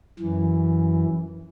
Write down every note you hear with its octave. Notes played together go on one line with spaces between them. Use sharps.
F#2 E3